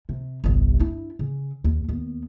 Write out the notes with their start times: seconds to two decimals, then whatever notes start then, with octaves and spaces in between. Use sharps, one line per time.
0.09 C3
0.44 G1 C2
0.79 D4 E4
1.19 C#3
1.64 D#2
1.88 D#2 B3